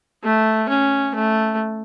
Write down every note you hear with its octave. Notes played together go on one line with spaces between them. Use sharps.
A3
C#4
A3